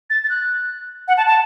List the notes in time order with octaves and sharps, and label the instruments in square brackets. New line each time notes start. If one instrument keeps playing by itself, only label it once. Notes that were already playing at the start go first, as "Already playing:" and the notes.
[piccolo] A6
A6
F#6
F#5
A5
A5